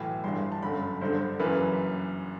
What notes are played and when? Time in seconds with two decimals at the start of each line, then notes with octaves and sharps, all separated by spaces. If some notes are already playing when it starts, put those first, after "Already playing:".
Already playing: B1 A2 E3
0.24 G1 G2 E3 C6
0.52 A5
0.62 G1 F#2 D3 B5
1.01 G1 G2 D3 C5
1.39 F#1 F#2 E3 B4